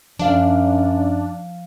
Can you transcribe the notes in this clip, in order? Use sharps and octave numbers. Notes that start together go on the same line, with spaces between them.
F#2 F3 D4 F5